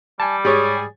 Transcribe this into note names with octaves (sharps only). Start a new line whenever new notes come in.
G3 G#5 A5
G#2 G4 G#4 C#5 A6